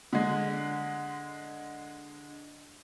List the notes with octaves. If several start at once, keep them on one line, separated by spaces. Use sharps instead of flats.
D3 G#3